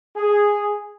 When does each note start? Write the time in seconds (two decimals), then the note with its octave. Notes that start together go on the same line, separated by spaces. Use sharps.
0.16 G#4